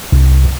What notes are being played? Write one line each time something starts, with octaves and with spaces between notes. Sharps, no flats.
C2